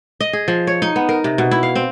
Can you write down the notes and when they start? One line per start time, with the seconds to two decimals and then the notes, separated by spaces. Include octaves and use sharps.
0.20 D#5
0.33 G#4
0.48 F3
0.67 C#5
0.82 D#4
0.96 B3
1.09 A#4
1.24 C3
1.38 B2
1.51 E4
1.63 F5
1.75 C4